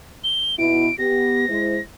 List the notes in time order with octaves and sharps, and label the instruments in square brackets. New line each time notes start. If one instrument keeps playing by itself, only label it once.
[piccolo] G7
[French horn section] B2 E4 [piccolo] D7
[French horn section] B3 G4 [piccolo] A#6
[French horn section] G#3 E4 C5